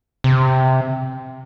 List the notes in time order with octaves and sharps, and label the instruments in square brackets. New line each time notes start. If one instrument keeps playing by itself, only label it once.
[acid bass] C3